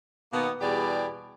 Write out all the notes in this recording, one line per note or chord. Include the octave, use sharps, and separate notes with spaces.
B2 D#3 A#3 B3
E2 B2 G3 G4 G#4 D5